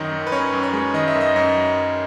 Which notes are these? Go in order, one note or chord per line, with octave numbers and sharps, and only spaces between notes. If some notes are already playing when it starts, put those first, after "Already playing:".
Already playing: F#2 D#3 D#5
F#2
B4
C#4 C#5
F#2
C#5
G#3
D#3 D#5
E5
F#2
D#5
F#2